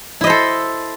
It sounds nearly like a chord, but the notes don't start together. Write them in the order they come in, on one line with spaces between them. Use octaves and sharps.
E4 D#5 C5 A4